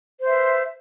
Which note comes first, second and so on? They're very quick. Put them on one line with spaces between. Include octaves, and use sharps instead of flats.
C5 E5 B4